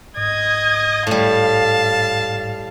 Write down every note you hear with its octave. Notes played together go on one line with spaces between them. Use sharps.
G#2 D#5 D#6 G#6
A2 G3 F5 A5